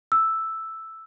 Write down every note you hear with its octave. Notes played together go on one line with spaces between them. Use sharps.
E6